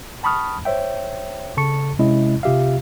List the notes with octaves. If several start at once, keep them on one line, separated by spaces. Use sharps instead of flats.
G5 A5 B5 C#6 D#6 F6
C5 C#5 E5 G5
C#3 A4 A5 C#6 C#7
C3 G#3 C#4 E4 D#5
C3 F4 G4 E5 F5